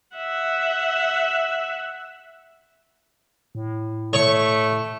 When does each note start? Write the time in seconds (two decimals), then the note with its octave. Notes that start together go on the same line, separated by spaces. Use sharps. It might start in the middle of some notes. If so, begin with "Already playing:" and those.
0.16 E5 F#5
3.55 A2
4.13 A3 C#5 C#6